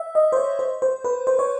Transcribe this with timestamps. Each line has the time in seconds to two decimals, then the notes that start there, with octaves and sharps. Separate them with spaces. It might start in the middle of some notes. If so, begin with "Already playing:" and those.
Already playing: E5
0.15 D#5
0.32 C5
0.37 C#5
0.59 C5
0.82 C5
1.04 B4
1.27 C5
1.39 C#5